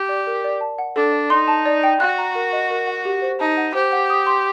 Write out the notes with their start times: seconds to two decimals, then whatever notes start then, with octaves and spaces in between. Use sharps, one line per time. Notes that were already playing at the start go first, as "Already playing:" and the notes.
Already playing: G4
0.09 D5
0.27 A#4
0.44 D5
0.61 A5
0.78 F#5
0.96 D4 A4
1.13 D5
1.30 D#4 C6
1.48 A5
1.66 D5
1.83 G5
2.00 F#4 F#6
2.18 A#5
2.35 A#4
2.53 D#5
2.71 A#4
2.87 F#5
3.05 G4
3.22 C5
3.40 D#4 A5
3.57 F#5
3.75 G4 C5
3.92 F#5
4.10 D#6
4.27 C6